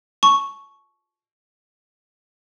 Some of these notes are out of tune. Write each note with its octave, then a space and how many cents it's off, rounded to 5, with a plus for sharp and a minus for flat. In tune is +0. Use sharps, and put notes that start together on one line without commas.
A5 -25 C#6 +0